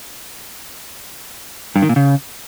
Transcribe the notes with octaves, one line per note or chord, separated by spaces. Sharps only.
G2
D#3
A#2
C#3